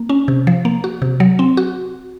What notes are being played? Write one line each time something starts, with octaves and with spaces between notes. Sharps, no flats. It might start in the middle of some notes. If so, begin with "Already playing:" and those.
Already playing: A#3
C#4
C3
F3
A#3
F#4
C3
F#3
C4
F#4